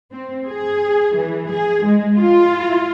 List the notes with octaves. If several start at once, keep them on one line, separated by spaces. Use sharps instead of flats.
C4
G#4
E3
G#4
G#3
F4